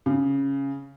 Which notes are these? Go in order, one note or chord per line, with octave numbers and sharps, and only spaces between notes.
C#3